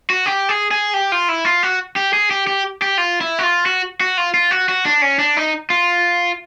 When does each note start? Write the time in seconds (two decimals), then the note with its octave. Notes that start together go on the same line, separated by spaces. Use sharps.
0.10 F#4
0.26 G4
0.49 G#4
0.71 G#4
0.94 G4
1.12 F4
1.29 E4
1.45 F4
1.63 F#4
1.96 G4
2.13 G#4
2.31 G4
2.47 G4
2.82 G4
2.98 F4
3.21 E4
3.39 F#4
3.43 F4
3.66 F#4
4.00 F#4
4.18 F4
4.34 F4
4.51 F#4
4.69 F#4
4.85 D4
5.02 C#4
5.19 D4
5.37 D#4
5.70 F4